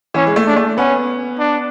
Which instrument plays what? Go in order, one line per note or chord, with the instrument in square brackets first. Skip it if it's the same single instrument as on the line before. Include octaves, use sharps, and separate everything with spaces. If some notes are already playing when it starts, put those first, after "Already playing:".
[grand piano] E3 [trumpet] C#4
[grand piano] G#3
A3
[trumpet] D4
[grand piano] A3
[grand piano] B3 [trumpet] C#4
[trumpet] D4